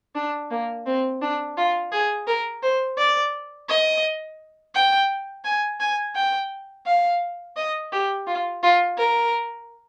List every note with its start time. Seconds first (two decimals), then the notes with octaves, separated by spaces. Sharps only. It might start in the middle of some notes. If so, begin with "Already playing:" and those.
0.15 D4
0.51 A#3
0.86 C4
1.21 D4
1.57 F4
1.92 G#4
2.27 A#4
2.63 C5
2.98 D5
3.68 D#5
4.75 G5
5.45 G#5
5.80 G#5
6.15 G5
6.86 F5
7.56 D#5
7.92 G4
8.27 F4
8.63 F4
8.98 A#4